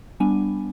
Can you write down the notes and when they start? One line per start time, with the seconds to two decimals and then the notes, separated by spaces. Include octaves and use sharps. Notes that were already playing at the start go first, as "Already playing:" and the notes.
0.20 G3 B3 D4 G#5